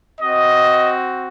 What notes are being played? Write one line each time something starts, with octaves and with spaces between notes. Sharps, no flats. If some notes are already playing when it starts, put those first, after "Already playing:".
C4 F#4 D#5